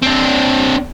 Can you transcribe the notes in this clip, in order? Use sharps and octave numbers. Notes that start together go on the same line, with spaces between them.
C4 D4